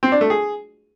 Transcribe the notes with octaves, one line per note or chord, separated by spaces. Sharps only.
C4
D4
A3
G#4